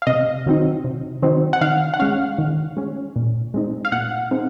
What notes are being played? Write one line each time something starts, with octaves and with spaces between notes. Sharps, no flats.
F5
C3 D#5
D#3 F#3 C4 D#4
C3
D#3 F#3 C4 D#4
F#5
D#3 F5
F#5
G#3 C#4 F5
D#3
G#3 C#4
A#2
G#3 C4 D#4
F5
A#2 F#5
G#3 C4 D#4